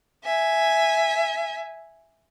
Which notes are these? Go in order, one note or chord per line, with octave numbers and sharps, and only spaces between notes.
E5 G#5